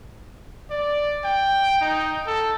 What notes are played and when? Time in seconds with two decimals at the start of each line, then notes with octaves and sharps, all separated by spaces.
0.70 D5
1.24 G5
1.81 D#4
2.27 A4